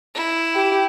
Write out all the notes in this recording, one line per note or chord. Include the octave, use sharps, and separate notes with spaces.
E4
G4